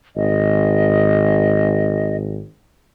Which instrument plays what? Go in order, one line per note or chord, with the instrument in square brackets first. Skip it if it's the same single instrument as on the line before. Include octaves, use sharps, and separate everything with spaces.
[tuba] G#1 [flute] D#5